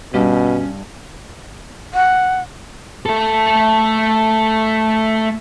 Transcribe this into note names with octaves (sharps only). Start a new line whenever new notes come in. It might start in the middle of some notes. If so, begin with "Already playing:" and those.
G2 B2 C#4
F#5
A3 A4